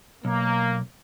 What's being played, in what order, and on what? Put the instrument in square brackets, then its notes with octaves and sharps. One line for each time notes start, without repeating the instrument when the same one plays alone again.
[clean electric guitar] B1 [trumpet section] A#3